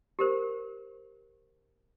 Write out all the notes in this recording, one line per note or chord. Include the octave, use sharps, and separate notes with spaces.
G4 A#4 C5